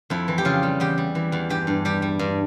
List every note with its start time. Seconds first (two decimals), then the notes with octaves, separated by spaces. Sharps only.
0.10 F2 E4
0.28 E3
0.38 G4
0.45 C#3 F4
0.63 G3
0.80 E2 G4
0.98 G3
1.15 E3
1.32 E2
1.50 G2 G4
1.67 G2
1.85 G3 G4
2.02 G3
2.19 G2